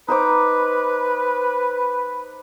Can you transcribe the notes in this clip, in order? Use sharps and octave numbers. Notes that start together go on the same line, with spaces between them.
D#4 B4 C5 D6